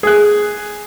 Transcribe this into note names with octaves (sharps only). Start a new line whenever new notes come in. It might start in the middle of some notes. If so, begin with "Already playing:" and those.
G#4 F#6